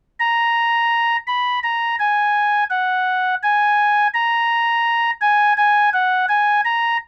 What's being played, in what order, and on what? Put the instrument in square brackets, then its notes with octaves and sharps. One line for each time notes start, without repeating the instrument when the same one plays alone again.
[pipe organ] A#5
B5
A#5
G#5
F#5
G#5
A#5
G#5
G#5
F#5
G#5
A#5